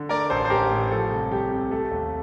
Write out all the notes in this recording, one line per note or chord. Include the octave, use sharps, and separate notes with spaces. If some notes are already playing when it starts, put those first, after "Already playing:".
Already playing: D3
A3 A#4 D5
A1 A4 C5
C5
A1 G4 A#4
A2
F3 A4
C2
C2 G4
C3
A3 A4
D#2